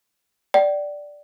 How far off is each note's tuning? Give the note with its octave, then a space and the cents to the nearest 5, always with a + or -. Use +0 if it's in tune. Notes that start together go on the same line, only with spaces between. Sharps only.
D5 +0 G5 -40